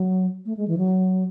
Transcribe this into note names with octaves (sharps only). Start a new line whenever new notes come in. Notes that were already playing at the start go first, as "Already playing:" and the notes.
Already playing: F#3
A3
G#3
E3
F#3